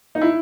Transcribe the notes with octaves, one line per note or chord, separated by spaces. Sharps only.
D#4
E4